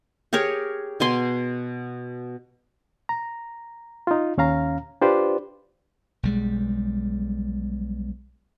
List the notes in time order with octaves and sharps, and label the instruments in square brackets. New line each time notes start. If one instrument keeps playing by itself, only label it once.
[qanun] G4 G#4 A#4 C#5
B2 G#5 C6
[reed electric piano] A#5
D#4 F4
D#2 C#4 F5 A#5
D4 F4 G4 B4 C5 D5
[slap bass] B1 G3 G#3